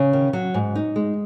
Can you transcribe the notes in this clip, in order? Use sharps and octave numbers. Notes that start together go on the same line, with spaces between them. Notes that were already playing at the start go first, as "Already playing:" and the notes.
Already playing: C#3
D#3
F#3
G#2
D#4
G#3